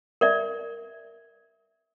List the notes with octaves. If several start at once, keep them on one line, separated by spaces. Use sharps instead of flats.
A#4 D5 E5